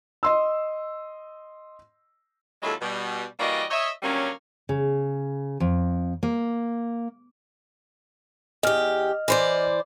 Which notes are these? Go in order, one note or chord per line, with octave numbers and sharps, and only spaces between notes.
D#5 C6 E6
D#2 F#3 G#3 E4 F4 A4
B2 G3
E3 G3 A#3 F#4 D5 D#5
C#5 D#5 E5
D3 F#3 G3 A#3 C#4
C#3
F2
A#3
E2 G4 D#5 F6
E3 C5 D5